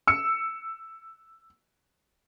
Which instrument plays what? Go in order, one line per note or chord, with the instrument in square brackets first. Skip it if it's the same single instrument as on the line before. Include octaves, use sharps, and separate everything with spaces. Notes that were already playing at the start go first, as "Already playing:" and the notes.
[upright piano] E6 C#7